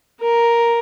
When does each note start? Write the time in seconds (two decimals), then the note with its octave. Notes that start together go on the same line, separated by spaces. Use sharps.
0.22 A#4